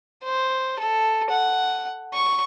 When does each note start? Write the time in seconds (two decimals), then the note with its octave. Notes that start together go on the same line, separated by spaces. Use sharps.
0.23 C5
0.79 A4
1.30 F#5
2.14 C#6